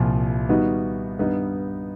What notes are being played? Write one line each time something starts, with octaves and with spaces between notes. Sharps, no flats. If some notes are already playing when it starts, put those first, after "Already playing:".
Already playing: C2 A#2 F3
D#3 G3 B3 D#4 F#4
G2 D#3 G3 B3 D#4